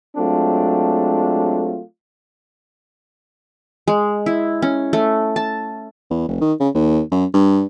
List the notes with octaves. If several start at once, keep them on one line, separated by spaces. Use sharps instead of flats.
F#3 G#3 A3 C4 D4 F4
G#3
E4
C#4
A3
A5
E2
F1
D#3
C#3
D#2
F#2
G2